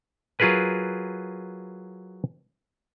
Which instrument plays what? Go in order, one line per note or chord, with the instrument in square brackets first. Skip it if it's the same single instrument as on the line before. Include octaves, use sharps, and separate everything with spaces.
[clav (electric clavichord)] F#3 F4 G#4 A#4 B4 G#5